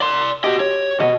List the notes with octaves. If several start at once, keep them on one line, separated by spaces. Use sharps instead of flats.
D5 C6
F#4 G4 D#5
C#5
C#2 B2 F#4 D#5